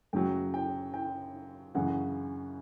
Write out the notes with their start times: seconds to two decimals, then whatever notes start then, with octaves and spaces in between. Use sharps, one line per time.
0.13 F#2 C#3 F#3 G5
0.54 G5
0.94 G5
1.74 F#2 C#3 E3 F#5